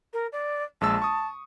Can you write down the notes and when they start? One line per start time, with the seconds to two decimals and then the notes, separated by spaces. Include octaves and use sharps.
0.13 A#4
0.32 D5
0.81 A#1 G#3 A5 E6
1.02 C#6 D#6